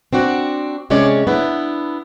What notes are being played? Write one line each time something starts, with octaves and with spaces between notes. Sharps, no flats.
C4 D4 F#4
C3 G#3 C#4 C#5 D5
B3 D4 E4